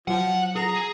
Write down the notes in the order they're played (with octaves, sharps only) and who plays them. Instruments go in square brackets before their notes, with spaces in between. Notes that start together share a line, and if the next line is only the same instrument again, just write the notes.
[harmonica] F3 [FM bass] F#3 [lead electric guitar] F#5
[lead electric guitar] G#4 [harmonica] A#5